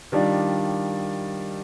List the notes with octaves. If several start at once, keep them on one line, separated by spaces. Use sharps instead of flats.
D#3 G3 D4 F4